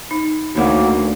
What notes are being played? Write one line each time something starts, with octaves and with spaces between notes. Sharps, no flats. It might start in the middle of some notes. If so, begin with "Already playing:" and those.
D#4
D2 A#3 D#4 F#4 C#5 F#5